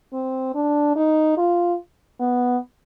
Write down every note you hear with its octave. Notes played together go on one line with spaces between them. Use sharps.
C4
D4
D#4
F4
B3